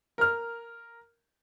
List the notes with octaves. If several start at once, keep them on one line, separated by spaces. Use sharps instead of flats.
A#4 F6